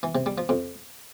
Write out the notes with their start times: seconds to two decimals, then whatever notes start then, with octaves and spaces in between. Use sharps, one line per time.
0.03 E3
0.15 C3
0.26 G3
0.38 F3
0.49 F2